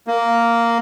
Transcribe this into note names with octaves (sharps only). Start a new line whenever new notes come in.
A#3